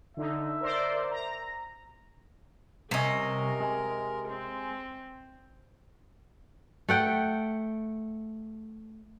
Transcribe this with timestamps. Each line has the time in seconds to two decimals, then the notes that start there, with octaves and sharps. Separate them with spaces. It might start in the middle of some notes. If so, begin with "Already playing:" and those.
0.17 D3 D#4 E5
0.61 A#4 C5 D5
1.11 A#5
2.91 C2 C3 C#4 A#4 D#5
3.60 G#3
4.27 C4
6.89 A3 F#5 G5